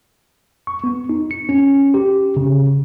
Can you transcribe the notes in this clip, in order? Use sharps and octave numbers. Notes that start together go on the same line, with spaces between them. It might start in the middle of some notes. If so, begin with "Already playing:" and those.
C#6
B3
D#4
C#7
C#4
G4
C#3